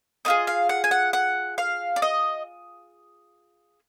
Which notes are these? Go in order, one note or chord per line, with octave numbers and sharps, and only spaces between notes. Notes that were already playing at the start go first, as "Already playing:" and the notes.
B3 F4 G#4 D#5
F5
F#5
G#5
F#5
F#5
F5
D5
D#5